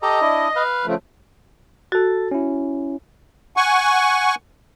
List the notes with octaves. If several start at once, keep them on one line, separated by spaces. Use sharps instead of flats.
G4 A4 D#5 A#5
D4 E4
B4 F5
C#3 F3 A3
F#4 A4 A6
C#4 E4
F#5 G#5 C#6